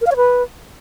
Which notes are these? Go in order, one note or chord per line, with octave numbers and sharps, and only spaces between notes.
A#4
F5
C#5
B4